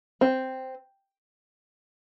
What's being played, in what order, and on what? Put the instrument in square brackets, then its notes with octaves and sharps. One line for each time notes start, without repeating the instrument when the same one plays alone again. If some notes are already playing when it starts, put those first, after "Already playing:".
[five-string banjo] C4